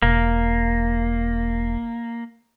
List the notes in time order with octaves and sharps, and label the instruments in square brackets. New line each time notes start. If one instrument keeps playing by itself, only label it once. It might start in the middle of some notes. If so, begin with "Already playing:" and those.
[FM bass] E1 [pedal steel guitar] A#3